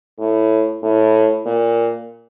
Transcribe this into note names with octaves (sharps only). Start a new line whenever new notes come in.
A2
A2
A#2